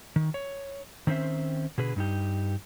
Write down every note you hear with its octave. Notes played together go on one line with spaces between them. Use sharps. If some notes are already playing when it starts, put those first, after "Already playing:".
D#3
C#5
D#3 C4 C#4 C5 E5
B2 D3 G#4 B4
G2 D#4 G4